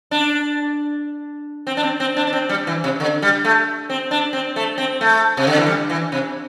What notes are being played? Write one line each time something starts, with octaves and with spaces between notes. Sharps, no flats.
D4
C4
D4
C4
C4
D4
D4
C4
G3
E3
C3
D3
G3
A3
C4
D4
C4
A3
C4
A3
C3
D3
E3
G3
E3
C3